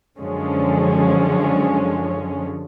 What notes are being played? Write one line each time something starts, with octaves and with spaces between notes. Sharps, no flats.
F#2 D3 F3 G#3 C#4